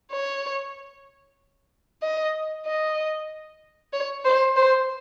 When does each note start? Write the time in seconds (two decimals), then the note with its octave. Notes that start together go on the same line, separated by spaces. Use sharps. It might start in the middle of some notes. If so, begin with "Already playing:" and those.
0.12 C#5
2.03 D#5
2.66 D#5
3.93 C#5
4.25 C5
4.56 C5